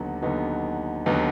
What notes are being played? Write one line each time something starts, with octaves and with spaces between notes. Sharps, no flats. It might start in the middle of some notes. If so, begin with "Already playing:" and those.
Already playing: D#2 D3 F#3 B3 D#4
D#2 D3 F#3 B3 D#4
D#2 D3 F#3 B3 D#4